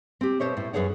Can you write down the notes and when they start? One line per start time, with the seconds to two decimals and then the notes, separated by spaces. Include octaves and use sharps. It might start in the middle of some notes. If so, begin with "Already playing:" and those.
0.21 C4 G4
0.40 B2 C5 C#5 E5
0.57 A2
0.73 F#2 F#3 G#4 B4 C#5 F#5